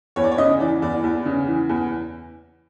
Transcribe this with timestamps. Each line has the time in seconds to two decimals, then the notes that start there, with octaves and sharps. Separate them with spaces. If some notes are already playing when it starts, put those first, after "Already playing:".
0.16 E2 C#5
0.24 D5
0.32 C#5
0.38 C#3 D#5
0.60 E3 D5
0.82 E2 D5
1.04 E2
1.25 C#3
1.47 E3
1.69 E2